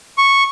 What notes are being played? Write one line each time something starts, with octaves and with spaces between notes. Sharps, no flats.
C#6